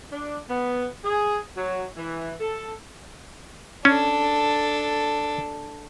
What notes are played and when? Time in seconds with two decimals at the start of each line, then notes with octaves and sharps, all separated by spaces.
0.11 D4
0.49 B3
1.04 G#4
1.57 F#3
1.96 E3
2.40 A4
3.85 C#4 D4 A4